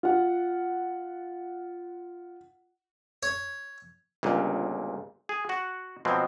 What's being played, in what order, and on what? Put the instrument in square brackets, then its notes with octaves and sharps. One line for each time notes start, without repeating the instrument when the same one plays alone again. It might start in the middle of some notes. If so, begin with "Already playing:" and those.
[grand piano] F4 F#5
[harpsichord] C#5
[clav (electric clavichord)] G1 C#2 A#2
G#4
F#4 F#5
B2 F3 F#3 G#3 C4